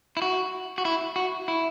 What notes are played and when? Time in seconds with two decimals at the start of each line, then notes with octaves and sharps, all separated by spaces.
0.17 E4
0.22 F#4
0.78 F#4
0.85 E4
1.16 F#4
1.48 E4